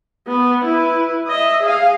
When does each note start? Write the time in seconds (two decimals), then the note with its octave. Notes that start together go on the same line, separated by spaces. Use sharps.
0.27 B3
0.64 E4 B4
1.28 D#5 E5
1.63 G#4 F5